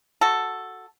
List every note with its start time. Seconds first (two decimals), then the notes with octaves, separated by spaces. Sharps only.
0.21 F#4 A4